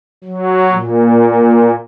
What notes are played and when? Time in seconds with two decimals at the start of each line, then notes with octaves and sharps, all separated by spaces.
0.24 F#3
0.72 A#2